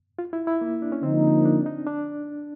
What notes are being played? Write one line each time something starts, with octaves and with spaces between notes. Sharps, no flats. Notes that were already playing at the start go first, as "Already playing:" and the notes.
F4
E4
E4
A#3
D4
C#4
D3 F3 A#3 C4 D#4
D4
D#4
D4